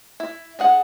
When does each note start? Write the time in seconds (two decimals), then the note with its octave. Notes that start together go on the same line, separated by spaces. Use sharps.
0.20 E4
0.59 D4 G#4 F#5